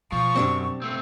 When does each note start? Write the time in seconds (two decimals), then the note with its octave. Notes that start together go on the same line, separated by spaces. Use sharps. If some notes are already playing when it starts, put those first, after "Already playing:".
0.12 B2 F3 C#6
0.36 B1 F#2 C4 D4 G4
0.82 A3 C4